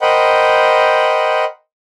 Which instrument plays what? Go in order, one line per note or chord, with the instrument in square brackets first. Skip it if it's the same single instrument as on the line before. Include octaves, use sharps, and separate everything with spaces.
[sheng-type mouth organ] A#4 C5 D#5 F#5 G5 B5